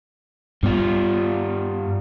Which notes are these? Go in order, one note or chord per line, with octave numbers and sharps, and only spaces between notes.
G2 G3 B3 F4